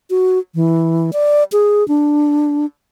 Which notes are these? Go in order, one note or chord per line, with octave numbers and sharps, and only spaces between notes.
F#4
E3
D5
G#4
D4